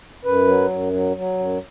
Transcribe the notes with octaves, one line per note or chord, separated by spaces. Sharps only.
F#2 B4
F#3
F#2
F#3
F#3
F#2